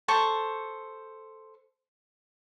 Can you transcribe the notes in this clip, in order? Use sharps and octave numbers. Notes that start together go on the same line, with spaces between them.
A4 C5 C#6